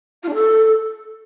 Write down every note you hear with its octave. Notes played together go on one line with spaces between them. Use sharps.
F4
D4
A4